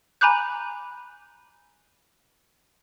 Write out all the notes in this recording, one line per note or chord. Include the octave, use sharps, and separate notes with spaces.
G#5 A#5 B5 D6 F#6 G6